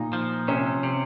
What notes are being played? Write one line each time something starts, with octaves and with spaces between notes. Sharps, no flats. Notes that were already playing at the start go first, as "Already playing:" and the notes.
Already playing: A#2 D#4
F3
C3 C#4
C3